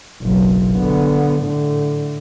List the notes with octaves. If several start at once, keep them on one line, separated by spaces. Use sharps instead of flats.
F#1 B1
D3 B3
A2 D3